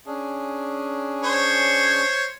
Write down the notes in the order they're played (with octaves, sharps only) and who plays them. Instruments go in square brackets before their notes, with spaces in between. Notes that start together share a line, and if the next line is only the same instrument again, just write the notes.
[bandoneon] C#4 D4 G#4
[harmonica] C5 C#5